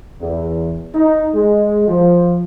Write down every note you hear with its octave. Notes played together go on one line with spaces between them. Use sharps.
E2
D#4
G#3
F3